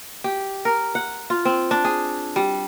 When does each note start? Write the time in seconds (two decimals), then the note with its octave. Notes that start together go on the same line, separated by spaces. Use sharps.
0.24 G4
0.65 A#4
0.95 F#5
1.30 F4
1.45 C4
1.71 D4
1.84 G#4
2.36 G3